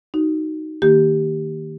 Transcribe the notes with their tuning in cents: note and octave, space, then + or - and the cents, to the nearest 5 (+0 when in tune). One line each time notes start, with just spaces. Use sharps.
D#4 +0 F#4 +25
D#3 +0 A#3 -10 G4 +0